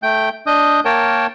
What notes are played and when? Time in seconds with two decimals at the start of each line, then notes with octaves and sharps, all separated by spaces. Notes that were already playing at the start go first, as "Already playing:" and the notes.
0.03 A3 G5 G6
0.47 D4 D#5 D#6 G6
0.85 A#3 A#4 C#5 G5 A5